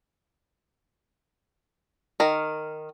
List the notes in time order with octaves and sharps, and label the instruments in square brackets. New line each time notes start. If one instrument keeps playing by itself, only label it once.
[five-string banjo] D#3 A#4